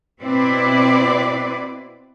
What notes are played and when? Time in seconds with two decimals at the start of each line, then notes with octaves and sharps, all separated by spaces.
0.22 B2 C4 E4 B4 D5